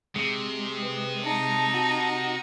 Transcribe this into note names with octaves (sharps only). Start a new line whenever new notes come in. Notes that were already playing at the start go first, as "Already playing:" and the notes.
C3 G#3
B4
D#4 A5
F#4